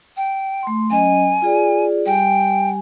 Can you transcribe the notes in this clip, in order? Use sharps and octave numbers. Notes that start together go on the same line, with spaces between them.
G5
A3 C6
F#3 C#4 D#5 G#5
F4 G#4 D5
G3 G4 G5 G#5